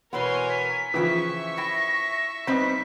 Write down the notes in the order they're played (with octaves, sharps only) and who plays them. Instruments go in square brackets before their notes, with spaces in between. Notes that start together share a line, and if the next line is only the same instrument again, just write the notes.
[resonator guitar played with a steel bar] B2 E3 B3 [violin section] A#4 C#5 G#5 [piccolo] C6
[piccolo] B6
[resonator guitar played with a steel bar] C#3 G5 [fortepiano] E3 F3 [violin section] E5 C#6
[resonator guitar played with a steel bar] E4 G5 [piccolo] A#6
[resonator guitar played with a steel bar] G3 C4 [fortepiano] B3 D#4 C5 [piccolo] B6